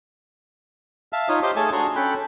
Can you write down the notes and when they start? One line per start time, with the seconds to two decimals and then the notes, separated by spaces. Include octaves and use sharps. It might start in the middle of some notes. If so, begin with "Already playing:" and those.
1.13 E5 F5 A5
1.29 D#4 F4 C#5 D#6
1.43 G4 C5 D#5 C6 D6
1.56 A3 G#4 A4 C#5 G#5 A5
1.73 D4 F#4 A#5 C6 C#6
1.96 C#4 A4 G5 B5 F#6